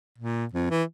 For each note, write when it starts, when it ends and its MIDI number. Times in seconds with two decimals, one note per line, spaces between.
0.18 0.46 46
0.54 0.66 41
0.71 0.84 52